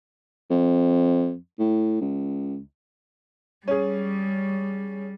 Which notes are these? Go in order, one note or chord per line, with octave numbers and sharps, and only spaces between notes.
F2
A2
C#2
G3 C#4 G#4